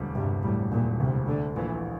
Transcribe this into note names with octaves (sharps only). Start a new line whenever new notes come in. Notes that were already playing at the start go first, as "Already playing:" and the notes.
Already playing: E1 D2 G3
G2 C3
A2 G3
E1 A#2
D2 C3
D3 A3
A#1 E3